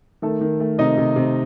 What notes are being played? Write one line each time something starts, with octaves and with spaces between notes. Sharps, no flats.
D#3 A3 A4
D#3
A3
C3 D#4 D#5
C3
C3